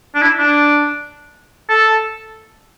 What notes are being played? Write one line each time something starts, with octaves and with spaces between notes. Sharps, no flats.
D4
E4
D4
A4